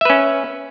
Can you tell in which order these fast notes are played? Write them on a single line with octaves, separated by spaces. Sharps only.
E5 B4 C#4